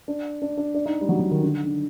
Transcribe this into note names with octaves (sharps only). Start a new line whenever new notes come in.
D4
D4
D4
D4
D#4
G3
F#3
F#3
D#3
D3
D3